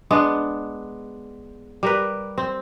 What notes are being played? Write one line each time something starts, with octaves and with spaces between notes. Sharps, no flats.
G#3 B3 D4
G3 A#4 B4
C4